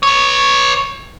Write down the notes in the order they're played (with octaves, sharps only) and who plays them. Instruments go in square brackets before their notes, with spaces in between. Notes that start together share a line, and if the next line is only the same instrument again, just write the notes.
[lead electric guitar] B4 C#5